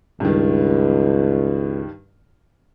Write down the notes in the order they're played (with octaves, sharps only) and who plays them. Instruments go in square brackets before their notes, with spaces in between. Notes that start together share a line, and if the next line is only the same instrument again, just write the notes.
[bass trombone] C#2 [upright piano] G2 D#3